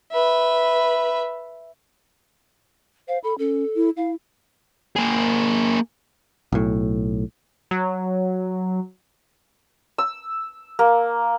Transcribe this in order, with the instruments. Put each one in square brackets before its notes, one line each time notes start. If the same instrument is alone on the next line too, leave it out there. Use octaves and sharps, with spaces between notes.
[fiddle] B4 E5
[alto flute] C5 [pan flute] F5
[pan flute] A4 [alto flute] B5
[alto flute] C#4 [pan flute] A4
[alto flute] E4
[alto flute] E4 [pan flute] F5
[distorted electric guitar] A#3 G#4
[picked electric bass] B1 A2
[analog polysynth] F#3
[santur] E6
A#3